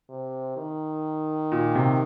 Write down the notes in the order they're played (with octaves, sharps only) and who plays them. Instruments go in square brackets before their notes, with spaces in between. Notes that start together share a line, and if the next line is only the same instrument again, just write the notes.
[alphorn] C3
D#3
[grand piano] A#2
C3